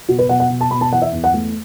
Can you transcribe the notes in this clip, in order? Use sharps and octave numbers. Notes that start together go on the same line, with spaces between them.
B2 F#4
B4
B2 F#5
F#5
B2
A5
B2 B5
A5
E3 F#5
E5
E2
F#5
A3